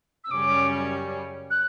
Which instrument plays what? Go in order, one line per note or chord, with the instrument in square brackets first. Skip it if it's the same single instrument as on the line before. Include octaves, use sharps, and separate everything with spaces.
[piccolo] E6
[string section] F#2 C#3 G3 C#4 [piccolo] D6
[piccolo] F#6